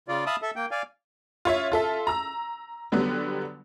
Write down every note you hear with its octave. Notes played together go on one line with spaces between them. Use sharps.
C#3 F4 D5
E5 F5 A5 B5 D#6
A4 E5
A#3 G5
D5 F5 G#5
F4 C#5 E5
F4 A4 E5
A#5 E6
D3 F#3 G3 B3